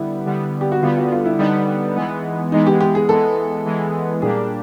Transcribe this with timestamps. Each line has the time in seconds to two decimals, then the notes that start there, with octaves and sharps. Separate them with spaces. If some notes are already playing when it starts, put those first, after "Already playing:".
Already playing: D3 G3 B3 E4
0.26 D3 G3 B3
0.61 G4
0.72 F#4
0.82 D3 G3 B3 F4
0.98 F#4
1.12 F4
1.25 E4
1.38 D3 G3 B3 D#4
1.96 E3 G#3 B3
2.52 E3 G#3 B3 D#4
2.67 G4
2.81 G4
2.95 G#4
3.09 E3 G#3 B3 A4
3.66 E3 G#3 B3
4.22 A#2 G3 A#3 D4 G4 G#4